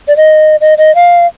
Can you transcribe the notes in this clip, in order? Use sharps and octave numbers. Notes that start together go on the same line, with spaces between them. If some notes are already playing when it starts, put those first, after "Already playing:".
D5
D#5
D#5
D#5
F5